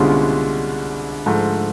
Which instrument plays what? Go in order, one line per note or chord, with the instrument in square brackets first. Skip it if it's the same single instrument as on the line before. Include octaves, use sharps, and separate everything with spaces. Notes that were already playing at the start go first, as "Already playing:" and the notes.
Already playing: [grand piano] C2 B2 G#3 C#4 F4 [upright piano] D3
[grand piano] G#2 F3 A3